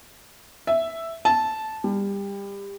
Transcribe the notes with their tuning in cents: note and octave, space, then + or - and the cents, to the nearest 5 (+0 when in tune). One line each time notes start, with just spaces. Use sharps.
E5 +0
A5 -10
G3 +25